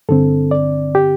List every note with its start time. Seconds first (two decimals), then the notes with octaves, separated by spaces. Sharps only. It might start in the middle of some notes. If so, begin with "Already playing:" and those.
0.09 G2 D3 C4 A4
0.51 D5
0.95 G4